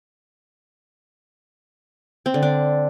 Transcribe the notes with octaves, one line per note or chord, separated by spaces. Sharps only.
C4
D3
D4